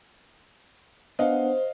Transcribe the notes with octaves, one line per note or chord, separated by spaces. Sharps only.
B3 D4 C5 D#5 F5 F#5